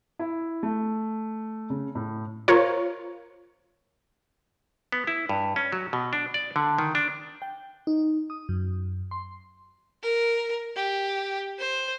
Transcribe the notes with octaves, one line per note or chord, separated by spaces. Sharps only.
E4
A3
C#3
A2
F4 A#4 C5 C#5
B3
E4
G2
C#4
F#3
B2
D4
D5
D3
D#3
D4
G5
D#4
D#6
F#2
C6
A#4
G4
C5